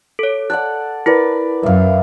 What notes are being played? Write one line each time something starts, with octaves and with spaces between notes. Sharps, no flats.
A4 C#5
A4 D5 F#5 F#6
E4 A#4 B4 D5
F#2 E5 F5